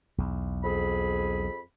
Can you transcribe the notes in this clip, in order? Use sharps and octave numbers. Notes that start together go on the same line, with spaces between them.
B1 E2
F2 G#4 B5